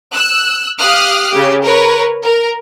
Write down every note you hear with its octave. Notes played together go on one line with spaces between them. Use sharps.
E6 F#6
G4 F5 D#6 F6 F#6
C#3 G4
A#4 B4 C#5
A#4